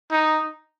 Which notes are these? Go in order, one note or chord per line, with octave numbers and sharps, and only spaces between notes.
D#4